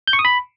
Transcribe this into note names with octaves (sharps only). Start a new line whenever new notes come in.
G6
C#6
D#6
B5